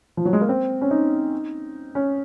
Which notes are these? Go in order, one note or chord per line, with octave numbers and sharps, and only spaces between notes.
F3
F#3
G#3
A#3
C4
C#4
D#4
C#4